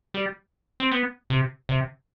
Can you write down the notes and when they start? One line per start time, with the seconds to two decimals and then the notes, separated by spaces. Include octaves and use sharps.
0.14 G3
0.80 C4
0.92 B3
1.30 C3
1.69 C3